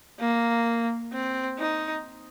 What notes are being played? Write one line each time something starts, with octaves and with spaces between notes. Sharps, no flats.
A#3
C4
D#4